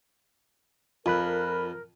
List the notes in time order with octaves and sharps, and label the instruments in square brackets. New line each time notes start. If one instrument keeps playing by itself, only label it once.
[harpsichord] F2 [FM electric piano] F4 B5 F#6 [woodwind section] A#4